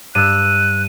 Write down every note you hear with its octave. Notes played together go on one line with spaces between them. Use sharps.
G2 E6 F#6 D#7